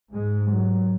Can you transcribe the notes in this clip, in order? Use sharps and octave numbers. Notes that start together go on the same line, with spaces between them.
G#2 G#3
F#3